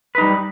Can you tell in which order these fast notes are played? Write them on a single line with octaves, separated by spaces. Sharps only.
B4 D#4 G3